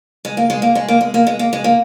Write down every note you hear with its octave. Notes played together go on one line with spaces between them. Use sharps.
G#3
A#3
G#3
A#3
G#3
A#3
G#3
A#3
G#3
A#3
G#3
A#3